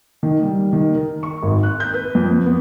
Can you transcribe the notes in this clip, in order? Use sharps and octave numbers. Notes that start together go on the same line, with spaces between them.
D#3
G3
D#3
A#4
C#6
G#1
F#6
G6
B4
F2
B3